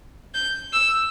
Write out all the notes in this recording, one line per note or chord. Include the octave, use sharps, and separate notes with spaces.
G6
E6